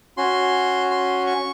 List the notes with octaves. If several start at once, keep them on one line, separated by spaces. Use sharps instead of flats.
C#4 F#4 C6
C6
C#6